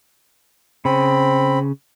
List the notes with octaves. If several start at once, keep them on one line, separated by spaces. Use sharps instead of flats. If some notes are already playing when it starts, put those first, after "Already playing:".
C#3 C4 B5